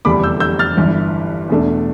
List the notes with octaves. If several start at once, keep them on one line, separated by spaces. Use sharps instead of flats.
F1 E2 D3 G3 D4 B5 D6
E6 G6
E6 G6
F6 A6
G1 G2 E3
E2 B2 A3 D4